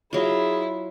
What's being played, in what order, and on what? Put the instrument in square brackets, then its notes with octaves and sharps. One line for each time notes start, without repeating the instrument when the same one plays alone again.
[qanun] F#3 F4 [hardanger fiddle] E4 [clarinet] G#4